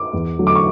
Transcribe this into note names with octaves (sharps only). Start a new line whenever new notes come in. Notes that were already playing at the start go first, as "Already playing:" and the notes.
Already playing: D6
E2
D3 F#3 A3
D6
C#6